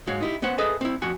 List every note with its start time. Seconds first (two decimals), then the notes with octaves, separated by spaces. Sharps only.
0.07 G#2 G#3 F#4 C#5 F5
0.21 D#4 E4 G4
0.42 B3 C#4 C5 F#5
0.58 G#4 A4 B4 D#5 E5 G#5
0.81 C4 E4
1.02 F2 F#4 G#5